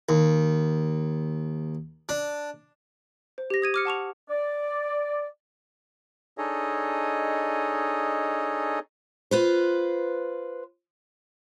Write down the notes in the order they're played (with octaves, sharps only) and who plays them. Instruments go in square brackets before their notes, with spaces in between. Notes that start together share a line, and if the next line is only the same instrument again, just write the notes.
[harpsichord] D#2
D4
[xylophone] C5
G4 A#6
D#6 G#6 D#7
D6 F6 C#7
F#5 A5 C#6 F7
[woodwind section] D5
[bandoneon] D4 D#4 G#4 A4 C#5 D#5
[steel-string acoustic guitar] F4 B4 C5